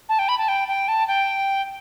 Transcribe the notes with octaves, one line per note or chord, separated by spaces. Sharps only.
A5
G5
B5
A5
G5
G5
A5
G5